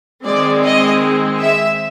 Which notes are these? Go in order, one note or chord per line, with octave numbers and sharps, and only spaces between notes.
D#3 G#3 C4 D5
D#5
E5